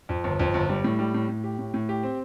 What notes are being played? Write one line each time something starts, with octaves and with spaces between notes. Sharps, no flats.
F2
G1
F2
G1
G3
A2
G3
A2
A2
G4
A2
A2
G4
C4